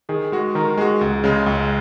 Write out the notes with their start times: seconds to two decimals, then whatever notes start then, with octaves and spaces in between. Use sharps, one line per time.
0.09 D#3 G#4
0.32 G#3 F#4
0.55 D#3 A#4
0.77 G#3 F#4 G#4
1.01 C#2
1.24 C#3 G#3
1.46 C#2